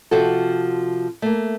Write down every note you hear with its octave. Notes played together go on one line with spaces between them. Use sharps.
C3 F3 F#4 A4
A3 A#3